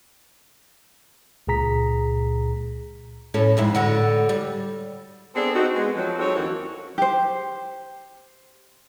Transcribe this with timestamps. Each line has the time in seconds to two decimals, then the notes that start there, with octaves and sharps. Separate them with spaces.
1.47 C#2 A#2 G#4 A#5 B6
3.34 A2 C#4 A4
3.57 F2 G#2 E4
3.75 A2 D3 F#4
4.29 G3
5.34 B3 C4 D4 G#4 A4
5.54 C4 D#4 F#4
5.74 G#3 B3
5.96 F3 F#3 C4
6.19 F#3 C4 D#4 F#4 A4 C#5
6.35 D#2 E3 F3 A#3 C#4 F#4
6.98 G4 C5